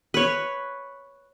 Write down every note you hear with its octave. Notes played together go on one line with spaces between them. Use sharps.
B4 C#5